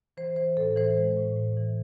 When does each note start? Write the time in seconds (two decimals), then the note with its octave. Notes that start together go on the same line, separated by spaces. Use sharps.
0.17 E3 C5
0.36 E3 C5
0.57 A2 A4
0.76 E3 C5
0.97 G#3
1.17 A2
1.36 A2
1.57 E3